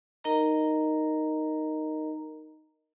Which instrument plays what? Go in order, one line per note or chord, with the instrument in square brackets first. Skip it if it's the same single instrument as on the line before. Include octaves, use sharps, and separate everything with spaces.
[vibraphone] D#4 A#4 D#5 A#5